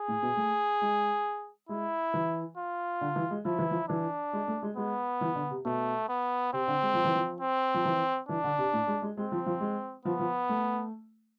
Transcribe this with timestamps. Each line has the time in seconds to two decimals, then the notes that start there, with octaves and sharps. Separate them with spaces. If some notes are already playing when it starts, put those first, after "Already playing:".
Already playing: G#4
0.08 A2
0.23 B2
0.37 A3
0.82 G#3
1.69 G#3 E4
2.14 E3
2.58 F4
3.01 D3
3.16 E3
3.31 G#3
3.45 F3 E4
3.59 E3
3.71 F3
3.89 E3 D4
4.33 G#3
4.48 A3
4.63 G#3
4.77 G#3 B3
5.21 E3
5.36 D3
5.51 C3
5.65 B2 A3
6.09 B3
6.53 C3 C4
6.68 D3
6.82 G#3
6.94 F3
7.05 E3
7.15 F3
7.41 C4
7.74 F3
7.85 E3
8.29 E3 D4
8.44 D3
8.58 C3
8.73 A2
8.87 G#3
9.02 G#3
9.17 G#3 C4
9.32 F3
9.46 F3
9.61 G#3
10.05 F3 B3
10.20 F3
10.49 A3